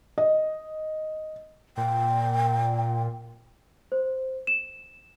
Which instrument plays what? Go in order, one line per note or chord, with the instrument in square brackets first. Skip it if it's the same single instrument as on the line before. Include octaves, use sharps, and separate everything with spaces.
[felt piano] D#5
[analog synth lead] A#2 [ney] G5
[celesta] C5
E7